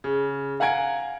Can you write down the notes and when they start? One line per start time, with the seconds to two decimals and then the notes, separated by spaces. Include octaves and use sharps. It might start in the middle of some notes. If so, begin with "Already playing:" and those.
0.04 C#3
0.60 F5 F#5 G#5 A#5 G#6 D7